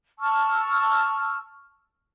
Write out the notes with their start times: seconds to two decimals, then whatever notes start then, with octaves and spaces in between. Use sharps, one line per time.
0.19 A5 C#6 E6 F6